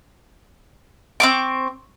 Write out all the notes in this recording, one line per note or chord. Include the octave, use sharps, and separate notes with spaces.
C4 C#6 D6